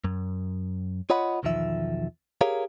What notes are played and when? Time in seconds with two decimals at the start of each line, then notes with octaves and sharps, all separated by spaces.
0.04 F#2
1.10 F4 C#5 D#5 F#5 B5
1.43 B1 E2 D#3 F3 E5
2.41 G4 G#4 A#4 C#5 F5